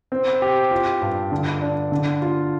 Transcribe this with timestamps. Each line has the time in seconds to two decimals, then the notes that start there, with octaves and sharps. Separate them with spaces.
0.12 C4
0.42 G4
0.71 F4
1.02 G2
1.32 D3
1.62 D4
1.92 D3
2.22 F4